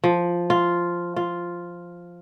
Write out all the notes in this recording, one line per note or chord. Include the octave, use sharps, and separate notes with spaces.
F3
F4
F4